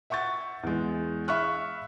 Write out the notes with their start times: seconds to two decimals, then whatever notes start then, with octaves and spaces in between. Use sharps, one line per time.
0.10 E5 F#5 C#6 G6 A6
0.63 E2 G#3
1.28 E5 F5 B5 C#6 F6 F#6